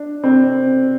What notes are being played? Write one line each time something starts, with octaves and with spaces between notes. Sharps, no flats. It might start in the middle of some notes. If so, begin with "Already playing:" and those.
Already playing: D4
C4